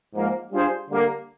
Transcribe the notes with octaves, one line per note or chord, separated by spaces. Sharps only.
G#2 F3 A#3
G3 D4 F4 G#4 C5
D3 G3 A#3